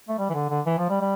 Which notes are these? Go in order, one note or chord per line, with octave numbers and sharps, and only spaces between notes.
A3
G3
E3
D3
D3
E3
F3
G3
G3